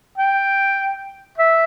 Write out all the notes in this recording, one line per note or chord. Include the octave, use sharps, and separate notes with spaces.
G5
E5